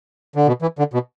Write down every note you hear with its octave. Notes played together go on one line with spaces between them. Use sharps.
D3
B2
E3
D3
B2